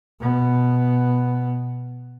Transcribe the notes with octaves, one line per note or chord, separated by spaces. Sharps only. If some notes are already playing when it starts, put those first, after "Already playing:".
B2 B3